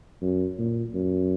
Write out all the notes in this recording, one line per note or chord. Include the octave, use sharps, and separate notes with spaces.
F#2
A#2
F#2